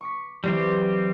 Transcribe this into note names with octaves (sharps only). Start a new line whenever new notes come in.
C#6 D6 B6
E3 F#3 G3 C4 G4